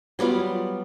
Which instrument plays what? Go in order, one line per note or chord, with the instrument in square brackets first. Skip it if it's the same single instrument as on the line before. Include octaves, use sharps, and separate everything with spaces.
[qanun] F#3 G3 B3 F4